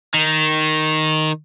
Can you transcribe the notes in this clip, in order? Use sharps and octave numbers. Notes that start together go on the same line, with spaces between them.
D#3